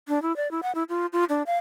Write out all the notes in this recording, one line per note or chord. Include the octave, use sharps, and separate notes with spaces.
D4
E4
D5
E4
F#5
E4
F4
F4
D4
F5